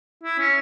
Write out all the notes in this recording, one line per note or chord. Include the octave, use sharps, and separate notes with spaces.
E4
C#4